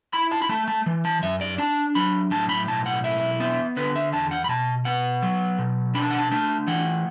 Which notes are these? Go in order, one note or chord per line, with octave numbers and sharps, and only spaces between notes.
E4 B5
A5
B5
A3 A5
A5
E3
A5
F#2 E5
D5
D4 A5
F#3 B5
A2 A5
B5
B1 A5
F#5
E4 E5
B3 E5
D3 B4
E5
E2 A5
F#5
B5
B2 A5
B3 F#5
F#3
B2
D4 B5
A5
F#5
A5
A3 A5
E3 F#5